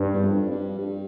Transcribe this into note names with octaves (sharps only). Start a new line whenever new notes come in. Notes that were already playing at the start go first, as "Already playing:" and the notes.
Already playing: G2
E2
F2
G2
G2